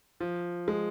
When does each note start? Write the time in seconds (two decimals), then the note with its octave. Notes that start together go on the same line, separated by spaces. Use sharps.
0.20 F3
0.68 G#3